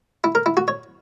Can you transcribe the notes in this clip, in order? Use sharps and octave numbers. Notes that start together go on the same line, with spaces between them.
E4
A#4
E4
F#4
C#5